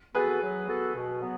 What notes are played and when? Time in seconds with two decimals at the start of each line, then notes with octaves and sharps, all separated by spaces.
0.14 B3 F#4 G#4 A4 B4
0.42 F#3
0.68 B3 F#4 A4
0.95 B2
1.21 F#3 B3